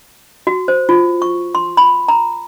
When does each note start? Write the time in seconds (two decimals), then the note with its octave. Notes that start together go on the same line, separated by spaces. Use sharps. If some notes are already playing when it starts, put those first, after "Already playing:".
0.47 F#4
0.68 C5
0.89 F4
1.22 C#6
1.55 C6
1.77 B5
2.08 A#5